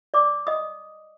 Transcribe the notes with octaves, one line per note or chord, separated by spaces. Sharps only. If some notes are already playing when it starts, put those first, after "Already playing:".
D5 D6
D#5 D#6